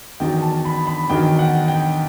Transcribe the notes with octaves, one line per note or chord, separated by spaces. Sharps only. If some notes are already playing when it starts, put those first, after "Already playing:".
E2 D#3 F#3 G5
A5
B5
B5
E2 D#3 F#3 G5
F#5
G5